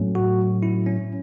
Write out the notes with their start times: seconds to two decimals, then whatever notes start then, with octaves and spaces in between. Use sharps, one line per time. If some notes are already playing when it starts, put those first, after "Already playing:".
Already playing: A2 F#3 A3 C#4
0.15 F#4
0.63 E4
0.86 C#4